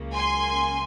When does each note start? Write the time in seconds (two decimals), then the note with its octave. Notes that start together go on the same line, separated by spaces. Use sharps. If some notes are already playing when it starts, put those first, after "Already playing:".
Already playing: C#2 C#3 F#3 A#3
0.14 G#5 C6